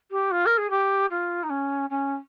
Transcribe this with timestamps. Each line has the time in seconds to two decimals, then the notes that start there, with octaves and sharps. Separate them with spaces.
0.11 G4
0.31 F4
0.46 A#4
0.58 G#4
0.70 G4
1.10 F4
1.43 D#4
1.50 C#4
1.90 C#4